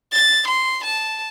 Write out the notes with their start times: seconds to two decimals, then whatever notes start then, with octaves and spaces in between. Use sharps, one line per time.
0.12 A6
0.48 C6
0.84 A5